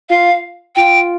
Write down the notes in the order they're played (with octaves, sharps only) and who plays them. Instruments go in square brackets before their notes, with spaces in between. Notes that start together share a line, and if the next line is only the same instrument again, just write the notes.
[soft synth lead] F4 [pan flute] F5
[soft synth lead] F4 [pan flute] G5